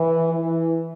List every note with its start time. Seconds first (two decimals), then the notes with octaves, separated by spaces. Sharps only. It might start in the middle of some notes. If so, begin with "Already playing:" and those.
Already playing: E3
0.30 E3